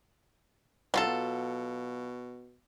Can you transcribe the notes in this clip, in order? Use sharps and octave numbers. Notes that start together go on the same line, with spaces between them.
C2 F#3 F4 A4
B2